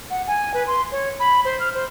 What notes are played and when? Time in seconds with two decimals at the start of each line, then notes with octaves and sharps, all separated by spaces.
0.10 F#5
0.27 G#5
0.54 B4
0.67 C6
0.92 C#5
1.20 B5
1.45 C5
1.60 F6
1.75 C5